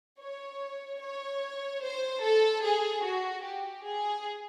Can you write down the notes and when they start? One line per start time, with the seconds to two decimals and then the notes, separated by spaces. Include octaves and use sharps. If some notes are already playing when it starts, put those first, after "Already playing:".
0.21 C#5
1.02 C#5
1.83 C5
2.23 A4
2.64 G#4
3.04 F#4
3.45 G4
3.85 G#4